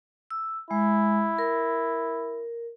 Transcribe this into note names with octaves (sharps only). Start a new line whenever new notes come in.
E6
G#3 E4
A#4